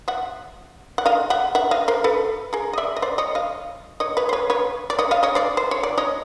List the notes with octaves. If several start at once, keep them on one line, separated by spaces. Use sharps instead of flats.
E5 F#5
F#5
D#5 F5
E5 F#5
E5 F#5
D#5 F5
A#4 C5
A4 B4
G#4 A#4
D#5
D5 E5
D#5
C5 D5
C#5 D#5
D#5 F5
C#5 D#5
B4 C#5
C5
B4 C#5
B4 C#5
D5
C#5 D#5
D#5 F5
C#5 D#5
C5 D5
C5
C#5
D5
C#5 D#5